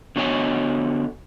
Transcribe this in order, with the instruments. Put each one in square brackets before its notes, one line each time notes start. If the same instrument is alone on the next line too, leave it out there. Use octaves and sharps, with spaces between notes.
[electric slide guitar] D3 B3 F#4 C#5 D#5 G#5